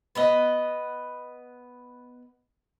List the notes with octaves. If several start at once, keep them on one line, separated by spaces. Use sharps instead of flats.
B3 B4 D#5